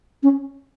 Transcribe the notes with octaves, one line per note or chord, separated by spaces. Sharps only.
C#4